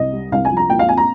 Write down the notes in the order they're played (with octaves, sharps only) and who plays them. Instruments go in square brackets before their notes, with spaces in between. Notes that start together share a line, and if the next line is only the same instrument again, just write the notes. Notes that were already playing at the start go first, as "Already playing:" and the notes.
Already playing: [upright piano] C2 D#5
G3
C2 F5
G#5
F3
A#5
A#2 G5
F5
C4 G#5
A#5